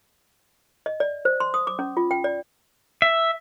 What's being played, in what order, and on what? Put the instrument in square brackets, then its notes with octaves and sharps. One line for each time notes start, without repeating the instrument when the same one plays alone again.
[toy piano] D#5
D5
C5
C6
D#6
D6
C#4
F4
G5
D5
[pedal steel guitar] E5